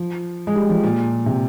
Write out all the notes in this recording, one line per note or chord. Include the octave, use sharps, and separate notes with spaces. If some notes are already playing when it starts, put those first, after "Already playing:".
Already playing: F3
G#3
G3
F3
A#2
C3